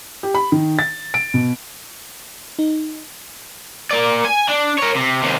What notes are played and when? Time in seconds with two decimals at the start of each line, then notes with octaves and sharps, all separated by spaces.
0.23 G4
0.35 B5
0.52 D#3
0.79 A6
1.14 D7
1.34 B2
2.59 D#4
3.91 A#3 D5
4.24 G#5
4.49 D4
4.79 A#4 C#5
4.96 C3
5.22 D#2 C3